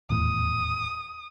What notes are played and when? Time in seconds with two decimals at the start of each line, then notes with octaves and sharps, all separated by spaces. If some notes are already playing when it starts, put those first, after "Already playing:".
0.10 D#1 E2 A2 D#6